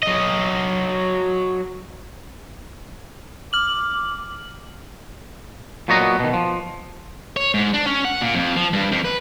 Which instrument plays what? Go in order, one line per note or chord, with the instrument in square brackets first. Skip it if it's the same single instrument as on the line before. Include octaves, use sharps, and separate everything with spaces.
[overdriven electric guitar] F#3 D#5
[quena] D6 [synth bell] F6 F#7
[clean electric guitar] A#2 F#3 B3 F#4 D#5 A#5
B2 D#3
F3
[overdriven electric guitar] C#5
G#2
D4
C#4
F#5
A#2
F2
F3
G2
F2
B4